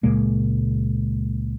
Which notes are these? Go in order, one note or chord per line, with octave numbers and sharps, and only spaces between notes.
C#2 A#2 G#3 A#3